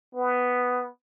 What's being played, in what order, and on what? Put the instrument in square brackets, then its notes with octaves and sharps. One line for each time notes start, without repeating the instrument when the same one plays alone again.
[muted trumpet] B3